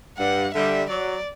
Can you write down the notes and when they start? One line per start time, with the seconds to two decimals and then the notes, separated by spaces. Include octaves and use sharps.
0.18 G2 F#5
0.54 D3 G3 E5
0.89 F#3 D5